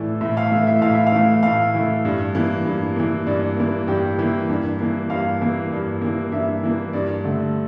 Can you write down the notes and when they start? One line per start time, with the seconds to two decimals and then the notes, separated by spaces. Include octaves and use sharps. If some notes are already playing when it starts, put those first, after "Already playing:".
Already playing: A2 E3 A3 D5
0.21 A2 E5
0.37 F5
0.52 E3 A3 E5
0.67 E5
0.82 A2 F5
0.95 E5
1.07 F5
1.12 E3 A3
1.43 A2 F5
1.74 E3 A3
2.05 G2
2.35 E3 A#3
2.65 G2
2.96 E3 A#3
3.27 G2 D5
3.57 E3 A#3
3.88 G2 G4
4.19 E3 A#3
4.50 G2
4.79 E3 A#3
5.10 G2 F5
5.41 E3 A#3
5.72 G2
6.02 E3 A#3
6.32 G2 E5
6.63 E3 A#3
6.93 G2 D5
7.24 D3 A3